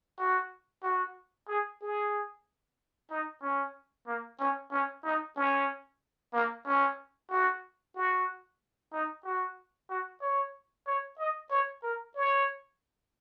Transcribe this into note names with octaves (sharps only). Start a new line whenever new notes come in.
F#4
F#4
G#4
G#4
D#4
C#4
A#3
C#4
C#4
D#4
C#4
A#3
C#4
F#4
F#4
D#4
F#4
F#4
C#5
C#5
D#5
C#5
A#4
C#5